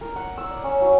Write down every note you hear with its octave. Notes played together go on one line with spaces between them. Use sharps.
A#4
F#5
E6
D5
C#4
F#3